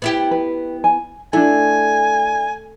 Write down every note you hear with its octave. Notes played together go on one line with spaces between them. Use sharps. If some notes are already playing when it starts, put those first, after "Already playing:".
B3 E4 G4
B4
G#5
A3 D4 E4 G#5